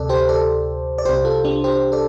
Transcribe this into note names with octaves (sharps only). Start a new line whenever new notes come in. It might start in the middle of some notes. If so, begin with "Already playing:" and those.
Already playing: D2 C3 A4 D5
G4 C5
A4 D5
D5
C2 C3 G4 C5
F4 A4
D4 G4
G4 C5
A4 D5